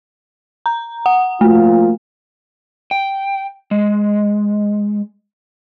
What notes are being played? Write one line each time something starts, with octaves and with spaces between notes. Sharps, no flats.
A#5
F#5
F3 A3 A#3 F4
G5
G#3